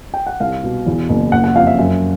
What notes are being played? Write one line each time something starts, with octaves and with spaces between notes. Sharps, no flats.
G5
F#5
C2 F5
B2
E2
F#1
F#1 F#5
F#5
F2 F5
E5
F#2 E5